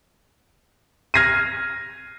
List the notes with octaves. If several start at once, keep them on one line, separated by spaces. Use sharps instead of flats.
F6 G#6 A#6 C7 D#7